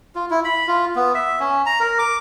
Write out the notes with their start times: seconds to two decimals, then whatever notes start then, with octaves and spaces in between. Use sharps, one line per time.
0.15 F4
0.30 E4
0.44 B5
0.67 F4
0.96 B3
1.15 E5
1.40 C#4
1.66 A#5
1.80 A#4
1.99 D6